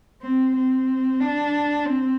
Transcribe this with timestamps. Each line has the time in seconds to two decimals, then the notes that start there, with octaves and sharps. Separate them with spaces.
0.22 C4
0.56 C4
1.20 D4
1.85 C4